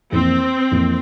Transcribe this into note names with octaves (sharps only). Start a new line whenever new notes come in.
F2 E3 A#3 C4 E4
F2 E3 A#3 E4